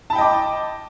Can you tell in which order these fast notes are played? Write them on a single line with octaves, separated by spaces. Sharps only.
A5 B5 G5 D#5 D6